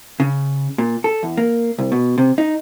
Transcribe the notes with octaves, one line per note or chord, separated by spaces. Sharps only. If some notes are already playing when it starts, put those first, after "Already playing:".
C#3
A#2
A4
E2
A#3
C2
B2
C3
D#4